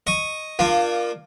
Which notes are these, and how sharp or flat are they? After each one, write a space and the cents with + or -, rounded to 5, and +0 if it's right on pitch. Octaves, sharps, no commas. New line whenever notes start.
D#5 +0 C#6 -5
A#3 +10 D4 +35 F4 +0